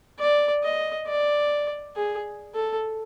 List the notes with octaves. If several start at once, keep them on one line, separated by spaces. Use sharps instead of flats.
D5
D#5
D5
G#4
A4